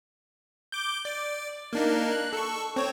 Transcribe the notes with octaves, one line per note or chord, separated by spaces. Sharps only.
D6 G6
D5 D6
A#3 D4 D#4
F#6
A4 C#6
C4 C#5